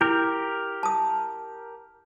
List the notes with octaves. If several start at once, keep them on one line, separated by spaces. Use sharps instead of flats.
E4 G4 A#4
A5 D#6